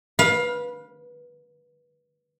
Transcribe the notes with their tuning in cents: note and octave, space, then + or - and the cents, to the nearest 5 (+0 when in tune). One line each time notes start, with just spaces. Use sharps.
B4 -20 F5 +20